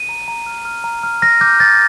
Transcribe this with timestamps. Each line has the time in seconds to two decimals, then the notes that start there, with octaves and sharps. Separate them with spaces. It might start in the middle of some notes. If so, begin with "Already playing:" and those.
Already playing: D#7
0.09 A#5
0.28 A#5
0.46 F6
0.65 F6
0.84 A#5
1.03 F6
1.22 F6 A#6
1.41 D6 G6
1.60 F6 A6